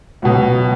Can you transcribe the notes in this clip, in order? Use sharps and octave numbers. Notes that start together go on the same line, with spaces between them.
C#2 B2 F#3 F#4